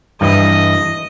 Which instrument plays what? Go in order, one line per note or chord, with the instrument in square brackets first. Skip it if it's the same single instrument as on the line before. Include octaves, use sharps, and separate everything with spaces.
[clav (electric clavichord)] G2 E3 [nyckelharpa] D#5